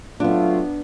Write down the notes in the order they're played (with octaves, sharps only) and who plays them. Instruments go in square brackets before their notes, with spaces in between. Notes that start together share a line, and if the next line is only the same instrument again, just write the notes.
[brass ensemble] F#3 A3 F4 [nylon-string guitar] B3 D4